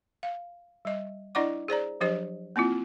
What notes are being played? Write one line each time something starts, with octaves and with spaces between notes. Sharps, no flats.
F5
G3 D#5
D4 E4 D5 D#5 F#5 D6
G#4 C5 D5 A#5
F3 F#3 D4 G4 C5 D#5
A#3 C4 E4 F4